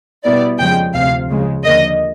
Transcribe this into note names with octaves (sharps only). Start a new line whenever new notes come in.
B2 G3 B3 E4 D5
F2 C#3 F3 G#3 G5
D2 C3 F3 F5
C#3 F3 G#3
D#2 D3 F3 A#3 D#5